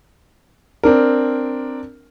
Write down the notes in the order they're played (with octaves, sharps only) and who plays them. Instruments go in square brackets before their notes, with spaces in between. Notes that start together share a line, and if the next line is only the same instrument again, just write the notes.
[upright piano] C4 D4 A#4